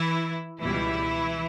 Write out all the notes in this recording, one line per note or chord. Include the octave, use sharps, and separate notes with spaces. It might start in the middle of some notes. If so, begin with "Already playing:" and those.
Already playing: E3 E4
C#2 B2 E3 G3 E4